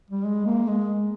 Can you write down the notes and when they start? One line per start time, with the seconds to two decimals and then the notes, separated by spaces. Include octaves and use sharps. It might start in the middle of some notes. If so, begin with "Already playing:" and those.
0.10 G3
0.25 G#3
0.46 A#3
0.68 G#3